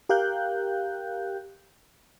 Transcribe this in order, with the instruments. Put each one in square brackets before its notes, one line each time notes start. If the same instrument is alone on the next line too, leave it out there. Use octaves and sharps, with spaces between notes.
[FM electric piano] G4 A#4 F5 G5 F#6 G6